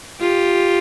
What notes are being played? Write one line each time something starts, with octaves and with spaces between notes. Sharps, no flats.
F4 G4